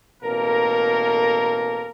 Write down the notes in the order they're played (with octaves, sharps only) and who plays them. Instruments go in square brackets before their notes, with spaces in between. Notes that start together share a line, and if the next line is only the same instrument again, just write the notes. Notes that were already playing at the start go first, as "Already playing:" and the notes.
[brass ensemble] A1 B2 A#3 A4 A#4